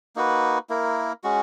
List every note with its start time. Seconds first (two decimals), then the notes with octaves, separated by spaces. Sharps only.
0.16 A#3 D#4 F#4 B4
0.69 A#3 E4 A#4
1.24 G#3 C#4 F#4